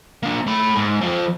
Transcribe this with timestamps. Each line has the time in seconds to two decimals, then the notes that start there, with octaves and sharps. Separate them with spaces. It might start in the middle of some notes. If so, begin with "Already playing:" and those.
0.23 A#3 D4
0.47 A3 B5
0.76 G#2
1.01 F2 F3